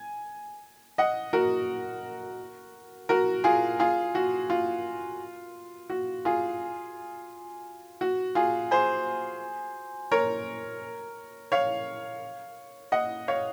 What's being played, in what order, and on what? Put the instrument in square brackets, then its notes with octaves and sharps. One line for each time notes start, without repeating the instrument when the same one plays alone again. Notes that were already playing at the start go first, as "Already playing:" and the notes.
Already playing: [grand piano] G#5
D#5 F#5
F#4 A#4
F#4 A#4
F4 G#4
F4 G#4
F#4
F4
F#4
F4 G#4
F#4
F4 G#4
G#4 C5
A#4 C#5
C#5 F5
D#5 F#5
C#5 F5